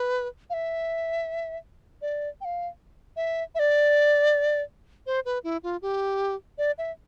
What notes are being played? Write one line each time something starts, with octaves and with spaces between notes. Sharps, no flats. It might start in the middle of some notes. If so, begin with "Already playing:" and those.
Already playing: B4
F5
E5
D5
G5
F5
E5
E5
D5
C5
B4
E4
F4
G4
D5
E5